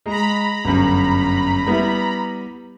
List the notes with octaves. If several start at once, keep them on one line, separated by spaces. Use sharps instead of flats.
G#3 A#5 B5
G1 F#2
G3 B3 E4